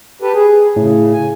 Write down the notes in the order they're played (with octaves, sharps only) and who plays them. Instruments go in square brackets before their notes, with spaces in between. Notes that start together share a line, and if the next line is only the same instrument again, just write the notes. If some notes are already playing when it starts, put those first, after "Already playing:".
[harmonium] G4 A4 B4
G#4
[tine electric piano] A2 [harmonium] C#3
[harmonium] G#5